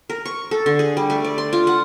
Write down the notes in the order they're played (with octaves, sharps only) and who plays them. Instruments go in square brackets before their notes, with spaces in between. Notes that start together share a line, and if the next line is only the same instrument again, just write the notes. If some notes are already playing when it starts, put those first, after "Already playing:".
[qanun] A#4
C#6
A4
D3
G#4
G3
A3
D5
C6
F4
F#5